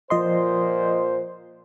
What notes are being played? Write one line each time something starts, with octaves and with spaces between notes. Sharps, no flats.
A#2 F3 C5 D#5 C6